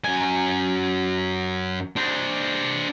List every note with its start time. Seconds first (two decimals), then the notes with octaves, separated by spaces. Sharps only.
0.05 F#2 G#5
1.96 D4 C5